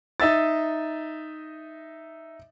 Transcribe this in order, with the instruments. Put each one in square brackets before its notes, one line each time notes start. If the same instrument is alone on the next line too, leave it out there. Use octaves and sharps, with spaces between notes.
[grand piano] D#4 D#5 E5 E6 A6